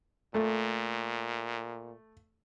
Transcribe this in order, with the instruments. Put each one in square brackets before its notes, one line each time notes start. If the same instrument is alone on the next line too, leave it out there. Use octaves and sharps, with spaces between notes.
[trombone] A#2 [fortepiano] A3